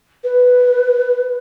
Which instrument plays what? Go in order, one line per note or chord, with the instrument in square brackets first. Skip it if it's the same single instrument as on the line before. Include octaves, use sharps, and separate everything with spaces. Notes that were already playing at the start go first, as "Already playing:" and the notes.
[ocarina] B4